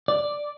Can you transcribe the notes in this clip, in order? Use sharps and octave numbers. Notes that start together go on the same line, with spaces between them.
D5